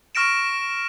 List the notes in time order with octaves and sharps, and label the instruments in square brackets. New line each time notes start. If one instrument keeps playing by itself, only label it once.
[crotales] C#6 F6 A#6 D7 E7